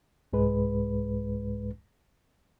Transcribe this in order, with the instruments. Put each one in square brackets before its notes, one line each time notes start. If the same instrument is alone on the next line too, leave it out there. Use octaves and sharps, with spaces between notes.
[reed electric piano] C2 G#2 G#3 B4